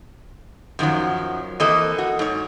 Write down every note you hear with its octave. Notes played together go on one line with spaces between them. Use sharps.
F#2 D#3 F3 F#3
E3 A#3 C4 A4 D#5
F#4
G#2 C#5